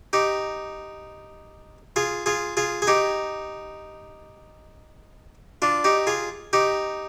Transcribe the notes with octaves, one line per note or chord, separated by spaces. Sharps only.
D#4 G4
F4 G#4
F4 G#4
F4 G#4
G#4
D#4 G4
D4 F4
D#4 G4
F4 G#4
D#4 G4